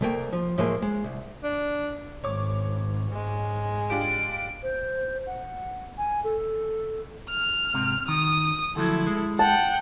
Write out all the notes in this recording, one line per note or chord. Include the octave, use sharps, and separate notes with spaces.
C2 A3 A#3 G5
F3
A2 F3 F#3 G#3 A#3
G#3
C2
D4
G#1 C#5 D6
G#2 G#3
D4 F4 G4 D7
C5
F#5
G#5
A4
F6
G#2 C3
D#3 D#6
D2 F3 F#3 E4 A4
G#3
F#5 G5 A5